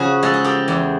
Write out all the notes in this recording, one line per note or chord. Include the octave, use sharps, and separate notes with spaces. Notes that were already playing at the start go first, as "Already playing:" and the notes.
Already playing: C#3 F3 F#4 G#4
G#3 A4
G#4
G4 A4
E2